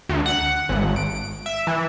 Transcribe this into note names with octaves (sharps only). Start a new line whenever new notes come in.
D2
F#5
G#1
D7
E5
E3